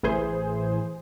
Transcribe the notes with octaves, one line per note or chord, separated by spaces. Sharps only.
A1 E3 G#4 C5